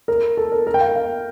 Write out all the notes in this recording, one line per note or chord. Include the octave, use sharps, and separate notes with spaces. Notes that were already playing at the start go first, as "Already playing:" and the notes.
A#4
A4
A#4
A#4
G5
F5
F5